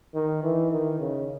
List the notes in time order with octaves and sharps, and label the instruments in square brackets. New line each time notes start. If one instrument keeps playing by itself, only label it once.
[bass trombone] D#3
E3
D#3
C#3